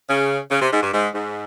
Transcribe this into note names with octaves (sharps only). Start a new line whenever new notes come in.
C#3
C#3
C3
G#2
G2
G#2
G#2